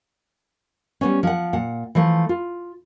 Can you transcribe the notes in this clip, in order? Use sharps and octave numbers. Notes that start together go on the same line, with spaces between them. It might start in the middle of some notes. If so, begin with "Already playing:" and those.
G3 B3 C#4
F3 F#5
A#2 F#5
E3 F3 A3
F4